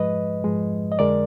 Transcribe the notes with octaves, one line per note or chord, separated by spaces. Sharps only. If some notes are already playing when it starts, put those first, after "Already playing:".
Already playing: G#2 F3 G#3 B4 D#5
G#2 F3 G#3
D#5
F2 D3 G#3 A#4 D5